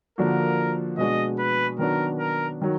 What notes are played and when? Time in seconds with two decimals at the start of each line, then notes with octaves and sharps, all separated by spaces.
0.18 D3 F3 A#3 D4 F#4 A#4
0.98 B2 G#3 D4 F#4 D#5
1.39 B4
1.79 D#3 F#3 B3 D4 F#4 A#4
2.19 A#4
2.61 D#3 F#3